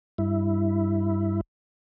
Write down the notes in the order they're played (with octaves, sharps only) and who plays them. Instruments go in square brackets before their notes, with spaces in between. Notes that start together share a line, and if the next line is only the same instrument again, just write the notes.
[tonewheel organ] G2 E4